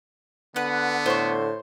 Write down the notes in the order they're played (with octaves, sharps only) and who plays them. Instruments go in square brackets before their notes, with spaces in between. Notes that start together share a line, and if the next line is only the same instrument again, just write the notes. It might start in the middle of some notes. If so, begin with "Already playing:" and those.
[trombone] D3 [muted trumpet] B3 [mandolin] B4 F#5
[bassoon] A2 [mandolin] C5 C#6